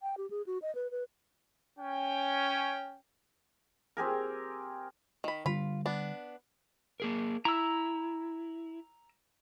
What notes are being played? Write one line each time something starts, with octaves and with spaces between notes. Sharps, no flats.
G5
G4
G#4
F#4
D#5
B4
B4
C#4 G5
C4 G4 G#4 A#4
D#3 B5
D3 G3 F4 B5
B3 D4
A#3 G#4 A#4
E4 A#5 E6